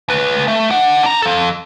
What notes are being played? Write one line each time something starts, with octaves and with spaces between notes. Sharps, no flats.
C#2 B4
A3
D4 F#5
D4 A#5
F3 A4